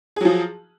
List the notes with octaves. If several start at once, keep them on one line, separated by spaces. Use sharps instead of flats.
F3 F#3 G#4